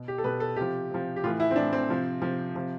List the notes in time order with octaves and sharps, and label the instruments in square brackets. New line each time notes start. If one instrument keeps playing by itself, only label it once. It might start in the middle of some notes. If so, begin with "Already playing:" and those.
Already playing: [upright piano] B2
G4
A4
B2 B4
A4
C3 F3 G4
C3 F3
G4
A2 E3 F4
E4
C4
A2 E3 D4
C4
C3 F3
C3 F3
C3 F3